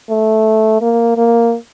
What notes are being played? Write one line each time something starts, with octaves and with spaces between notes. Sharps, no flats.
A3
A#3
A#3